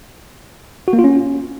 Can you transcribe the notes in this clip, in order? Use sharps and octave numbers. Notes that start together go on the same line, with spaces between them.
F#4
A#3
F4
C#4